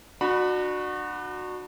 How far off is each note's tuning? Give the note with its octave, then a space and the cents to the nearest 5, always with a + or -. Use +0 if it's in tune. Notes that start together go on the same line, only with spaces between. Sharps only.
D4 +35 F#4 -15 B5 -10